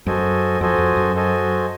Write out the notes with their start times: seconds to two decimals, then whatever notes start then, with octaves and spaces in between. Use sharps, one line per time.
0.06 F#2 F#4 A4 C5 D#5 G#5
0.61 F2 F#4 A4 C5 D#5 G#5
0.78 F2
0.97 F#2
1.15 F#4 A4 C5 D#5 G#5